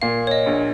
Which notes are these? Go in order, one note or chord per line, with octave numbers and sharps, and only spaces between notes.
A#2 F5
C#5
D#5
A#1